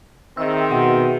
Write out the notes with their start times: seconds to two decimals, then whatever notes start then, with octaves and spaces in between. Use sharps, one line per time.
0.37 D#3 C4 G#4 D#5 E5 E6
0.71 B2 F#5